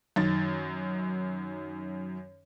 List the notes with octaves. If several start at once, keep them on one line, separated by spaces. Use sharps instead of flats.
F#2 D#3 A6